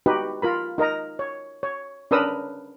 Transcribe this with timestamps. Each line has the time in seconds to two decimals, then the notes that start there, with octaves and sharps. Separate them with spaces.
0.06 D#4 F#4 G4 B4
0.42 F4 A#4 B5
0.78 D#4 A#4 D#5 A#5
1.19 C#5
1.63 C#5
2.11 C#4 D4 A#4 B4 D#6 E6